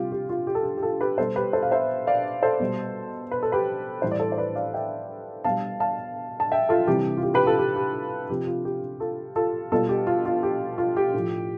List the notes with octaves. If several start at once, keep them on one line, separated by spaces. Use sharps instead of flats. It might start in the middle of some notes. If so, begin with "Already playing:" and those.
Already playing: C3 G3 F4 G4
G4
F4
G4
A4
G4
G4
F4 A4
G4 B4
B2 G3 A4 C5
G4 B4
A4 C5
F5
C5 E5
D5 F5
A4 C5
B2 G3
B4
A4
G4 B4
A2 E3 G3 C5
D5
A4 C5
C5
B4 D5
D5 F5
E5 G5
B2 G3 F5 A5
F5 A5
A5
E5 G5
F4 A4
C3 E3 G3 G4
F4
G4
G4 B4
F4 A4
G4
G4
C3 F3 G4
F4
G4
F4 A4
F4 A4
B2 G3 F4 A4
G4
F4
F4
G4
F4
G4
A2 F3